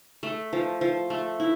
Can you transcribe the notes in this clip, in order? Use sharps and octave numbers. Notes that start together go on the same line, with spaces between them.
A3
F3
F3
A3
E4